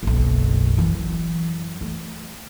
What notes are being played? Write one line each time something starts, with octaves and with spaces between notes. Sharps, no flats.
F#1 B1
F#2 E3
A3